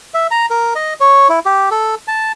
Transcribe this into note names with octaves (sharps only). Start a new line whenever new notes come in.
E5
A#5
A#4
D#5
C#5
E4
G4
A4
A5